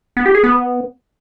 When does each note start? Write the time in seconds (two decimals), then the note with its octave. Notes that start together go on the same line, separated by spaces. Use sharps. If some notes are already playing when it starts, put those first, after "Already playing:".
0.17 B3
0.26 G4
0.35 G#4
0.44 B3